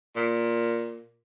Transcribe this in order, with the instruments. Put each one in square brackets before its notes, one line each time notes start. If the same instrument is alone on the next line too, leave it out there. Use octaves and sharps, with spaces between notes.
[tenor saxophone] A#2